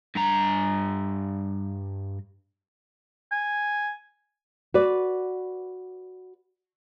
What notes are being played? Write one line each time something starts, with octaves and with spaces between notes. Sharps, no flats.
G2 A#5
G#5
F#4 B4 D5